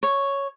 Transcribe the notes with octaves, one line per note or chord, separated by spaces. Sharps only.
C#5